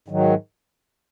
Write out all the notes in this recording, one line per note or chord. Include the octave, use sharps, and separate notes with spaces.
G#2 D#3 F#3